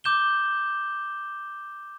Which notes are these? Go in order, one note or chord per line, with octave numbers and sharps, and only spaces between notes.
D6 G6 E7 G7